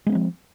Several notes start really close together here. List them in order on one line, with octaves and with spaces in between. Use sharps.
G#3 B3 C4 F3